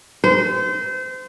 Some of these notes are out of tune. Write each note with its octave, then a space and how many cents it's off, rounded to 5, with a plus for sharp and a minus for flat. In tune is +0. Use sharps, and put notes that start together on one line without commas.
C5 -30